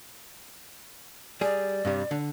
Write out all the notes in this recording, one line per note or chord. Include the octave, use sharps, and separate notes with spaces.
G3 G#4 D5
G2 C3 G3
D3